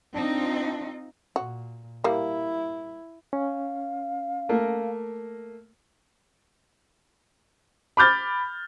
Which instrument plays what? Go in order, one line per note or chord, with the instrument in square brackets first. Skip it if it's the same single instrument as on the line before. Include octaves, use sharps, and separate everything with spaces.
[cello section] C4 D#4 F4 [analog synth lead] D4
[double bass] A#2 [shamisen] F#4
[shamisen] G3 A#3 [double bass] E4
[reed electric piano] C#4 [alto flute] F5
[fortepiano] A3 A#3 A#4
[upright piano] B5 D6 F6 G6 A6